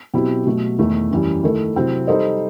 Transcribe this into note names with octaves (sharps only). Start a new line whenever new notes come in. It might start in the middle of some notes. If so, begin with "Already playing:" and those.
B2 F#3 C4 E4 G4
B2 F#3 A3
E2 D#3 A3 E4
F#2 E3 G3
D#3 A3 E4 A4
C3 F#3 C4 E4
G3 D#4 A4 C5 D#5